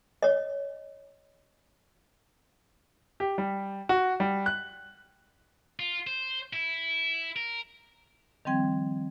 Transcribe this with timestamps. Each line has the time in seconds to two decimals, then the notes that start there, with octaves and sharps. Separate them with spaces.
0.22 C#5 D#5
3.20 G4
3.38 G3
3.89 F#4
4.20 G3
4.46 F#6
5.79 F4
6.07 C5
6.53 E4
7.36 A#4
8.45 D#3 F3 G3 C4 G5 G#6